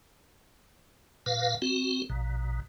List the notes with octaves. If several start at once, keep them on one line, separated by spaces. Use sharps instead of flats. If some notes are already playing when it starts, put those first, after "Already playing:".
A#2 B4 F5
C4 F#4
A#1 B2